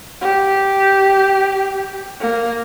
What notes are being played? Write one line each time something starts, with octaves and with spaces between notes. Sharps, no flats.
G4
A#3